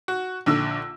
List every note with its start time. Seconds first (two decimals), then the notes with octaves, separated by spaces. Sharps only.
0.08 F#4
0.46 A#1 D3 E6